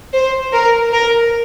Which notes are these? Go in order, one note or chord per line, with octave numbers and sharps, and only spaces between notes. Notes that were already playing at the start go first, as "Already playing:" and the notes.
C5
A#4
A#4